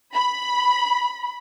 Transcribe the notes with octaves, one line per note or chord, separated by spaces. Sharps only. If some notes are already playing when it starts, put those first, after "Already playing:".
B5